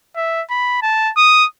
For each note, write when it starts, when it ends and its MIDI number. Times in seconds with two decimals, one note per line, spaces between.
0.16 0.42 76
0.50 0.82 83
0.82 1.11 81
1.17 1.46 87